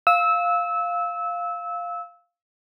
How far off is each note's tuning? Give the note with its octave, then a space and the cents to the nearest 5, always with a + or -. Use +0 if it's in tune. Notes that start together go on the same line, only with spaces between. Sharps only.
F5 +0 E6 -20